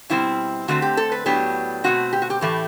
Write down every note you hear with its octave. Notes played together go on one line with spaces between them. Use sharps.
B2 G3 C4 E4
D3 A3 C4 F#4
G4
A4
B4
A2 F#3 B3 D4 G4
B2 A3 C4 F#4
G4
F#4
G4
A2 E3 A3 G4